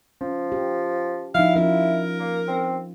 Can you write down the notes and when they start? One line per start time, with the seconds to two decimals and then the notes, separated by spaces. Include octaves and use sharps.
0.21 F3 C#4
0.52 G4
1.35 F3 D#4 E4 F5
1.56 F3 C#4 F4 A#4
2.19 A#3
2.48 C4